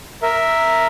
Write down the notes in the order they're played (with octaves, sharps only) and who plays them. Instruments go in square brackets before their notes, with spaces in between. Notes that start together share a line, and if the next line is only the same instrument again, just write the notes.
[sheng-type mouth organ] A#4 E5